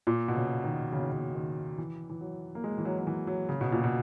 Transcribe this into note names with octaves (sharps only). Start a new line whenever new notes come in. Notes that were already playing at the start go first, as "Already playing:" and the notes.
A#2
B2
C#3
D#3
C#3
D#3
C#3
D#3
E3
E3
F#3
A#3
G#3
E3
F#3
F#3
E3
F#3
C#3
B2
A#2
B2